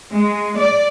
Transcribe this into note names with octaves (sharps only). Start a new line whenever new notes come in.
G#3
D5